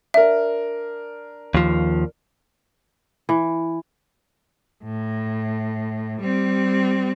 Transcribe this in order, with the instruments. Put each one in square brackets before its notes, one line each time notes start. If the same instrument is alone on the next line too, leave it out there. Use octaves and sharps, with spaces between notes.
[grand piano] D4 A#4 [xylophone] E5
[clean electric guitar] D#2 F3
[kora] E3
[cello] A2
G3 C4